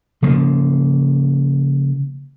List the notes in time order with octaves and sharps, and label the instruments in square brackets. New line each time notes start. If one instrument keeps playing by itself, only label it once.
[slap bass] C#3 F3 A#3